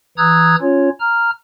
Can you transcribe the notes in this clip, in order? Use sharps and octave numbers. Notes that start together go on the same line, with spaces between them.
E3 A#5 D#6 E6 F#6 G#6
C#4 F4 C#5
A#5 F6